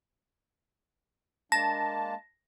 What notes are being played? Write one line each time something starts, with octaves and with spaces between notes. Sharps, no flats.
G#3 A#3 D4 A5 A#6